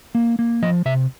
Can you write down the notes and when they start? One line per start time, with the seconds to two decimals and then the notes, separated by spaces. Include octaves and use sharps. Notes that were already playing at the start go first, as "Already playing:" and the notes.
0.15 A#3
0.39 A#3
0.62 F3 D#5
0.85 C3 E5